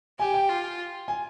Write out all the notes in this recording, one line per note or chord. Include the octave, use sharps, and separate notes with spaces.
G4 G#5
G5
F4
G#5